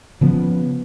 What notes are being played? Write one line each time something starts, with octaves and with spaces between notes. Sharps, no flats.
C#3 F3 B3